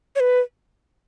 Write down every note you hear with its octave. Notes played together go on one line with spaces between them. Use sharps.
C#5
B4